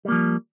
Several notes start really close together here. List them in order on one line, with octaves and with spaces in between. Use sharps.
G3 A#3 F3